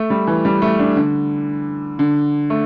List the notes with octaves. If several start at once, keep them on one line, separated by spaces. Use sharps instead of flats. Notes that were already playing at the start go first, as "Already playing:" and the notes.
Already playing: A3
G3
E3
G3
A3
D4
D3
D3
A3